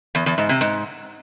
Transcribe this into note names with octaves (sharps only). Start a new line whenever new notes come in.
E2
E2
G#2
C3
G#2